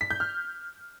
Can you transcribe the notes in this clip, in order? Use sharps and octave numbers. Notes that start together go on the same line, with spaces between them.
B6
G6
F6